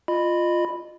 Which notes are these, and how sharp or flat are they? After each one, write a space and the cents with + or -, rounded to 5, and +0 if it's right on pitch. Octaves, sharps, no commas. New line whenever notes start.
F4 +0 D#5 -25 B5 +0